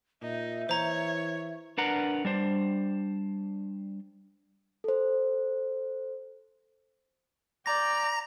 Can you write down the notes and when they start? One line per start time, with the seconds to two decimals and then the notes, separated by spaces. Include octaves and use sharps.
0.22 A#2 D#4 E5
0.69 E3 C5 C#5 A#5
1.78 D4 A#4 B4 F#5 A#5
2.25 G3 D4 C5
4.84 A4 C5
7.66 D5 G5 A#5 A#6